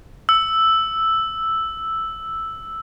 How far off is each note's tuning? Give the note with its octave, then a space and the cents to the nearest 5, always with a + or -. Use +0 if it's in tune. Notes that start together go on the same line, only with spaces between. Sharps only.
E6 +0